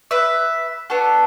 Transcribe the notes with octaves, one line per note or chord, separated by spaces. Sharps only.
B4 E5
B3 D4 F#4 A4